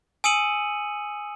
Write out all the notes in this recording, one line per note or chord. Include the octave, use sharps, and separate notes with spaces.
G#5 D#6 E6 C#7 D#7 F#7